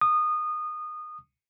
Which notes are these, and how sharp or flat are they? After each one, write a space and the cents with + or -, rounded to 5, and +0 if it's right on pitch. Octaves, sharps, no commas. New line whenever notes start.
D#6 -20